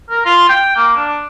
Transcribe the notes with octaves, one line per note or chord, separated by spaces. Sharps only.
A#4
F4
G5
A#3
D4